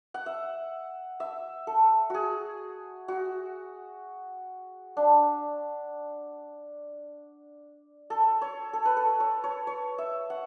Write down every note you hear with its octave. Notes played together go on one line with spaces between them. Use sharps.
F#5
E5
E5
A4
F#4 G#4
F#4
D4
A4
C#5
A4
B4
A4
C#5
C#5
C#5
E5
F#5